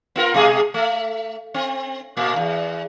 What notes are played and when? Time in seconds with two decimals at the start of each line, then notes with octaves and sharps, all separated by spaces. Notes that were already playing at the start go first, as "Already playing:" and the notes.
0.16 B3 F4 A#4
0.34 B2 G#3 G#4
0.74 A3
1.54 C4
2.17 A#2 A#3
2.36 E2